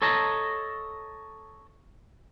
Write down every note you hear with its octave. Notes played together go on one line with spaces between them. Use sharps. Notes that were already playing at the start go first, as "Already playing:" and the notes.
A4 C#5 D#5 A5 A#5